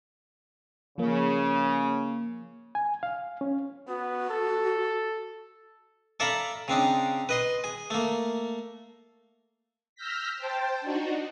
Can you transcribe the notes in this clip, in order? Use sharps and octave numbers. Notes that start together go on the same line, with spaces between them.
C#3 F3 A#3
G#5
F5
C#4
B3 F#4
A4
A4 D5 E5 F5 A#5 B5
C#3 C4 D4 D#4
B4 D#5 C6
G#4
A3 A#3
E6 F6 G6 A#6 B6
C5 G5 A5
D4 D#4 F#4